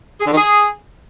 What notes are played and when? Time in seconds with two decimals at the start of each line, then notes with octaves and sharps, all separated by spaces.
0.21 G#4
0.26 D3
0.32 D#3
0.37 G#4